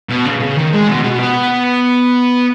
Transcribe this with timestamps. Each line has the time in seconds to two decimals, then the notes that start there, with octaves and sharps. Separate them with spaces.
0.09 B2
0.25 C#3
0.40 C#3
0.56 D#3
0.73 G#3
0.88 B2
1.04 B2
1.19 B3